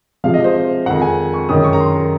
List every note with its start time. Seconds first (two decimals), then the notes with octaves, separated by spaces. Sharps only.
0.24 C3 F3 G#3 F5
0.34 D#5
0.44 C5
0.86 F2 D#3 G#3 F#5
1.01 G#5
1.34 C#6
1.49 F#2 D#3 G#3 D#6
1.64 C#6
1.73 A#5
1.80 C6
1.96 A#5